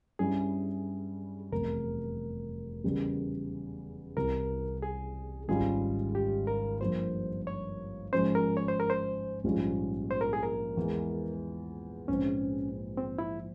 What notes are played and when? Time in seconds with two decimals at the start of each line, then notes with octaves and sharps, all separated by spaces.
0.19 G2 G3 C#4 E4 G#4
1.51 F1 E2 C3 A#4
2.84 E2 C#3 G3
4.16 C2 C3 E3 A#4
4.82 G#4
5.48 G#1 G#2 G3 C#4 F4 G#4
6.15 G4
6.47 A#4
6.81 G2 F3 A#3 C5
7.47 C#5
8.13 G#2 F3 G#3 C#4 C5
8.35 A#4
8.57 C#5
8.68 C5
8.80 A#4
8.90 C5
9.44 A#1 G#2 G3 C#4 F4
10.11 C5
10.21 A#4
10.33 G#4
10.43 A#4
10.77 E2 E3 G#3
12.08 A#1 G#2 F3 C4 C#4
12.97 C4
13.19 E4